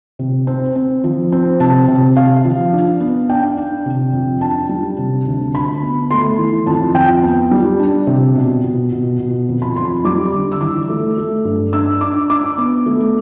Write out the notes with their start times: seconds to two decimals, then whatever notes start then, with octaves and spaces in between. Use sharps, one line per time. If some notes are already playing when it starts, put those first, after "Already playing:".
0.19 C3
0.47 C4
0.76 C4
1.04 F3
1.32 C4
1.60 C3 A5
1.88 C3
2.16 C3 F5
2.45 F3
2.73 D4
3.00 B3
3.29 D4 G5
3.57 D4
3.86 C3
4.13 F2
4.41 D4 A5
4.69 G3
4.98 C3
5.26 D2
5.54 D2 B5
5.83 B3
6.11 A3 C6
6.39 E3
6.66 F2 A5
6.94 F2 G5
7.23 B3
7.51 G3
7.79 D4
8.07 C3
8.36 B2
8.64 B2
8.92 B2
9.20 B2
9.49 F2
9.62 B5
9.76 F2 C6
10.05 G3 D6
10.33 D3
10.52 E6
10.61 E3 D6
10.89 A3
11.18 A3
11.45 G2
11.73 D4 E6
12.01 D4 D6
12.30 D4 D6
12.58 B3
12.86 A3